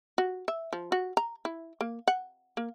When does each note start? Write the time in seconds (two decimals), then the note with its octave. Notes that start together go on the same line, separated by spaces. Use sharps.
0.18 F#4
0.48 E5
0.73 F3
0.92 F#4
1.17 A#5
1.45 E4
1.81 A#3
2.08 F#5
2.57 A#3